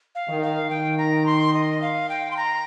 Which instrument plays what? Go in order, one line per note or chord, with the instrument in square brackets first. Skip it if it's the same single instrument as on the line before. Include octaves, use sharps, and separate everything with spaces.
[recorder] F5
[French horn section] D#3
[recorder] F5
[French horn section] D#3 [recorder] G5
[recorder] A#5
C6
D#5
F5
G5
C6
A#5